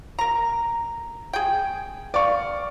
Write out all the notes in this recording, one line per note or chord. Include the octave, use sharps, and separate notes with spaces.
A#4 A#5
G#4 G5
D5 F5 C#6